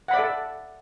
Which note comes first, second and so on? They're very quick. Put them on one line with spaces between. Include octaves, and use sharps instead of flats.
F#5 B5 D5 E5 A4